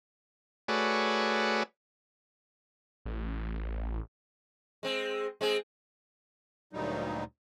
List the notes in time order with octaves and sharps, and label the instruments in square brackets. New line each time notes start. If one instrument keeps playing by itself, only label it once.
[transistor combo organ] A3 F#4 G#4 B4 C#5 D5
[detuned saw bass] A1
[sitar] G#3 C4
G#3 C4 G#4
[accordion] D2 G2 A#2 F#3 G3 D#4